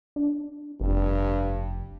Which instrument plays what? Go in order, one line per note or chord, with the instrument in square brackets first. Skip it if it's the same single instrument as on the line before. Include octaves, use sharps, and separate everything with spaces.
[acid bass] D4
[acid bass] F1 [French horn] G2